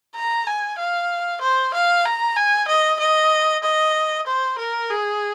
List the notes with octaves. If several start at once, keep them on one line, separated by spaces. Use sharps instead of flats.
A#5
G#5
F5
C5
F5
A#5
G#5
D#5
D#5
D#5
C5
A#4
G#4